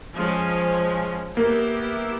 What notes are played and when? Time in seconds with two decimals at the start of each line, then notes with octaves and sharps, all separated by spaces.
0.14 F3 G#3 C#4
1.36 A#3 B3 E4 G4